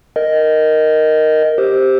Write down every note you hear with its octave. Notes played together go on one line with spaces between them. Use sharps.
A#4 D#5
G4 C5